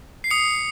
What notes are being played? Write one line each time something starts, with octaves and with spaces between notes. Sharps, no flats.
C7
D#6 C#7